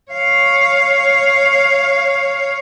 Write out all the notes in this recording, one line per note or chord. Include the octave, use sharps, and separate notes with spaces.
C#5 F5